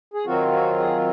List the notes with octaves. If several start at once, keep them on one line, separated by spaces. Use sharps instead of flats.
G#4
D#3 F#3 C4 F4 F#4
F#4
G#4